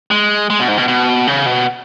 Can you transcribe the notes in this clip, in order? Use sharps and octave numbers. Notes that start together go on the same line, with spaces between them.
G#3
G#3
B2
G#2
B2
B2
C#3
B2